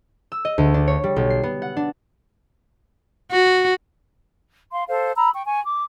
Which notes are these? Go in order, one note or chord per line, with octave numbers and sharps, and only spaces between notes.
E6
D#5
D2
D4
C#5
G3
B1
C7
B3
F#5
D4
F#4
F5 C6
A4 C5 F5
A#5 B5 E6
G5 C#6
G#5 C#6
D6